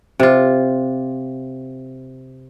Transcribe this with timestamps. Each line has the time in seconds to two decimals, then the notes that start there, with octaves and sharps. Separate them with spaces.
0.20 C3 F4